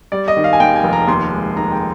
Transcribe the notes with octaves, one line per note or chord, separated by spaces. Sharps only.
G3 D5
D#5
D#3
F5
G#5
D#2 G5
G#5
F1
A#5
D#2 C6
G#3
D#3 A#5
G5